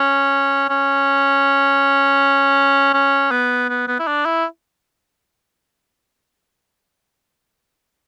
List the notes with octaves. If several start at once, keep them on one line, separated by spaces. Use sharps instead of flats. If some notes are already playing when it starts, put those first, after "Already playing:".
Already playing: C#4
C#4
C#4
B3
B3
B3
E4
D4
E4